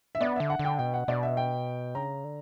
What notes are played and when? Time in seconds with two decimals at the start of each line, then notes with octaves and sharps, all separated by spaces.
0.15 E5
0.21 B3 D5
0.36 D3 E5
0.50 F#5
0.59 D3
0.65 G5
0.79 B2 G5
0.94 F#5
1.08 B2 D5
1.23 E5
1.37 G5
1.95 C#3 A#5
2.24 D3